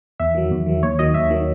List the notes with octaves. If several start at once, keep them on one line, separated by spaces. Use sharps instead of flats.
E2 E5
D#3 F#3
E2
D#3 F#3
D#2 C#5
D#3 F#3 D#5
D#2 E5
D#3 F#3